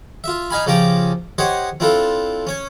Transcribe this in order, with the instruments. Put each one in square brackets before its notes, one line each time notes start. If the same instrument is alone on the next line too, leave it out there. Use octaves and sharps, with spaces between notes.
[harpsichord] F4 E5
D#4 D#5 F5 G#5 B5
C#3 F3 C#4 G4 A#5 D6
G4 C5 C#5 D#5 F#5
C4 D4 E4 F4 A4
C#4 C#5